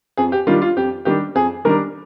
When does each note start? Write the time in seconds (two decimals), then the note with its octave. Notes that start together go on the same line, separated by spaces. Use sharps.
0.17 F2 G#4
0.32 G4
0.47 D#3 G3 D4 F4
0.62 F4
0.77 F2 G4
1.05 D#3 G3 D4 G4
1.35 F2 G#4
1.65 D#3 G3 D4 A#4